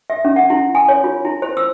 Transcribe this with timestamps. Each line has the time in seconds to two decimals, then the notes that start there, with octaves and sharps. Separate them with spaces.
0.10 E5
0.25 C#4
0.36 F#5
0.50 E4
0.75 G#5
0.89 C#5
1.04 F4
1.25 E4
1.42 C5
1.57 E6